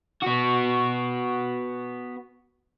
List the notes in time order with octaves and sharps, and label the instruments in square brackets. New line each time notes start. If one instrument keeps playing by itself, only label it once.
[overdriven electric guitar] B3 F#4